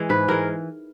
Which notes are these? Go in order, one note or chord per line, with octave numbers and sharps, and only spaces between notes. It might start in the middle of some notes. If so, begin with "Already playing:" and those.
Already playing: E3 G#3
G#2 B4
E3 G#3 A#4